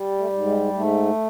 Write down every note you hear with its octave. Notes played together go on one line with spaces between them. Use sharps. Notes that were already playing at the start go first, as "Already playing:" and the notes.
Already playing: G3
A3
G#2
G#3
G#2 A3